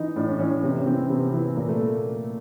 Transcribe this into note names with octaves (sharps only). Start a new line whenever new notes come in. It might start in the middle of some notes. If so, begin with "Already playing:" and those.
Already playing: E3 D#4
A2 D4
C#4
E3 C#4
C#4
C3 C#4
E3 C4
C3 B3
E3
A#2 A#3
A3
A#3